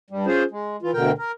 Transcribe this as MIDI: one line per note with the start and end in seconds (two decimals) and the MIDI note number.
0.10 0.26 43
0.10 0.26 55
0.26 0.43 61
0.26 0.43 65
0.26 0.43 68
0.26 0.43 72
0.51 0.76 56
0.82 0.91 52
0.82 0.91 65
0.94 1.11 38
0.94 1.11 47
0.94 1.11 50
0.94 1.11 70
0.94 1.11 79
1.18 1.32 70